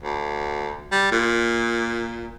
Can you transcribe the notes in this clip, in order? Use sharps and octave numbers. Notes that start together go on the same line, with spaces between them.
D2
G3
A#2